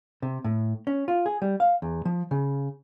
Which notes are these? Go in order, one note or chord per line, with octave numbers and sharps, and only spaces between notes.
C3
A2
C#4
F4
G#4
G3
F5
E2
F3
C#3